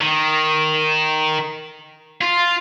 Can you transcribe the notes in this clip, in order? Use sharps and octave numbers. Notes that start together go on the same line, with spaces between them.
D#3
F4